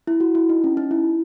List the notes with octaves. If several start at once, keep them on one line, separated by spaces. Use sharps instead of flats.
E4
F#4
E4
D#4
C#4
D#4
E4